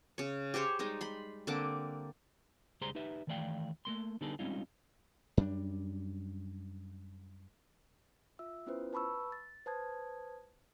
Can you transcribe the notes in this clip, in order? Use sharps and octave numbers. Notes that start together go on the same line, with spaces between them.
C#3 C#5
G4 G#4 C5 C#5
G3 G#3 D#4
B5 C6
D3 A#3 C4 D6
C#2 G3 G#4 C5 A#5 C6
D#4 G4 B4 E5
D#3 E3 A3 D5 F5 G5
A3 A#3 C6
D3 G3 B3 D#4 G#4 A4
G3 G#3 C4 C#4 D#4 F4
F#2 G3 D4
F4 E5 E6
B3 C#4 E4 F4 B4 C5
B4 A5 B5 C#6 E6
A6
B4 C5 A5 D#6 G#6